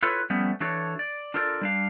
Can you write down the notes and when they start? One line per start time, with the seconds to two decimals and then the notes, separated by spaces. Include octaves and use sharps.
0.03 E4 F4 A4 B4 C#5
0.30 F3 G3 A3 B3 C#4
0.60 E3 D4 F#4 A4 C#5
0.99 D5
1.34 D4 F4 A4 A#4 C#5 D5
1.61 G3 D4 F5